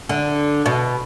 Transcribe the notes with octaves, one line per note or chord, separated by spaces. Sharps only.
D3
B2